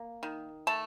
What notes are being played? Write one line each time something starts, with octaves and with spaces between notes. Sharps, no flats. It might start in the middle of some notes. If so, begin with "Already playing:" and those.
Already playing: A#3
D#3
A3 A5